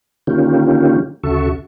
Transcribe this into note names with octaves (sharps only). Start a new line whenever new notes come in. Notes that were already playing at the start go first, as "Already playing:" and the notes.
D3 D#3 A#3 C#4 F4 G4
D2 C#3 F#4 A4 E5 C#6